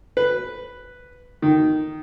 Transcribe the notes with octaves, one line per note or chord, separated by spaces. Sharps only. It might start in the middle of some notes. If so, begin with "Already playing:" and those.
B4
D#3